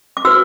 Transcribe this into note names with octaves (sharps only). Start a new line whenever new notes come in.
D6
F#4 B4 E6